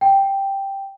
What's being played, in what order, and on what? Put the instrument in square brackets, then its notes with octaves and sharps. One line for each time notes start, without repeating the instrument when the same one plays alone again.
[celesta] G5